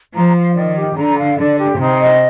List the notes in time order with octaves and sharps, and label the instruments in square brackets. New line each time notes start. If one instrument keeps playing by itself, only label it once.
[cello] F3 [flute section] A#5
[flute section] F5
[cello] D#3 [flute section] D5
[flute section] G4
[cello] D3 [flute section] A#5
[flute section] F5
[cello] D3 [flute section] D5
[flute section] G4
[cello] C3 [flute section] D#4
[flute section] D#5